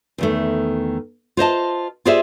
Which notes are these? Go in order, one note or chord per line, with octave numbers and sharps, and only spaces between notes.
E2 D#3 A3
F4 C5 D#5 A5
F4 G4 G#4 C5 D5 E5